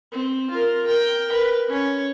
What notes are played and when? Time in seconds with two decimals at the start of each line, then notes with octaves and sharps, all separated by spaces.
0.12 C4
0.50 F4 A#4
0.86 A#4 G5
1.29 A#4 B4
1.68 C#4 C#5